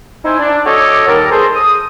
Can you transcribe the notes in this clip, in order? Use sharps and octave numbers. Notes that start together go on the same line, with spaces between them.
D#4 E4 C5 G#5
D4
F#4 A4 C#5 D#5 D6
D#2 G3 A#4 A5 A#5
G#4 A4 C5
D#6